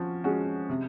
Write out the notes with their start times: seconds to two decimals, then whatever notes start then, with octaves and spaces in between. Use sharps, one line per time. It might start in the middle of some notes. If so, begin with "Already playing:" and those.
Already playing: F3 C#4 F#4
0.24 G#3 C#4 F#4
0.69 C3